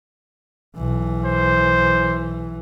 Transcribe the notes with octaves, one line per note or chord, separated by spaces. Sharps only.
B1 E3
C5